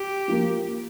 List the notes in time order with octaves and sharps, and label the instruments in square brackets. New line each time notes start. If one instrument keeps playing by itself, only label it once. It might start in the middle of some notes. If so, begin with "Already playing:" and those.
Already playing: [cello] G4
[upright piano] F3 A#3